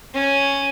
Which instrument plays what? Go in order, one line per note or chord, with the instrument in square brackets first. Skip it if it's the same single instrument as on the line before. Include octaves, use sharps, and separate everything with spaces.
[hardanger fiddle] C#4